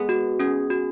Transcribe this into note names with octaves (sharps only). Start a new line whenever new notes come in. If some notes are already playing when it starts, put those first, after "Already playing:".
Already playing: G#3 B3
F#4
C#4 G#4
F#4